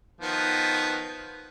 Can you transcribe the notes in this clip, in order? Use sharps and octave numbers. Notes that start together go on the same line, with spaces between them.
D#3 F3 B3